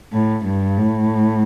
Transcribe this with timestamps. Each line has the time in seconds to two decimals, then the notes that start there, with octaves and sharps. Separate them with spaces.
0.12 A2
0.45 G2
0.77 A2